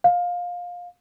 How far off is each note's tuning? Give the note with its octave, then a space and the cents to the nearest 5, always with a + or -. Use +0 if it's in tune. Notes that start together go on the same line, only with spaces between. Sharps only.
F5 +20